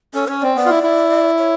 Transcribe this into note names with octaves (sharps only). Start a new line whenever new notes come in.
C#4 A4
C#4 C#5
C4 D5
B3 D5
F4
E4
E4
C#5